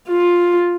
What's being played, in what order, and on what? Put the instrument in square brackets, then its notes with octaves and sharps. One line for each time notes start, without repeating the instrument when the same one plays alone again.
[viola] F4